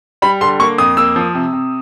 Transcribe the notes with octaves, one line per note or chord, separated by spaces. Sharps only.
G3 B5
D3 C6
A#3 C#6
F2 D#6
A#3 E6
F3
C3
C3